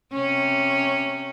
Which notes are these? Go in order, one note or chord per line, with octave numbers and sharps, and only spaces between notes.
C3 C#4